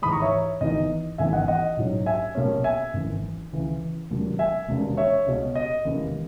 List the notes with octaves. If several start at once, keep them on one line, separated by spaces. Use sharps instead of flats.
G#2 E3 G#3 B5 D#6
A#5 C#6
C#5 E5
G#1 G#2 E3 B3 D#4 D#5
G#1 F#2 E3 B3 D#4 E5 G#5
D#5 F#5
D#5 F#5
A#1 G#2 F#3 C#4
E5 G#5
B1 A#2 A#3 C#4
E5 G#5
G#1 F#2 E3
C#2 C#3 E3
E1 D#2 C#3 F#3
E5 G#5
E1 D#2 C#3
C#5 E5
C#2 B2 G#3 C#4
D#5
E1 D#2 C#3 E3 G#3